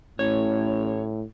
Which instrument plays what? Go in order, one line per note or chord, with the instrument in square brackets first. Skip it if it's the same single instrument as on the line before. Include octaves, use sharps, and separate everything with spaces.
[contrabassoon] A1 [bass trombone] A2 [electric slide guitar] C#5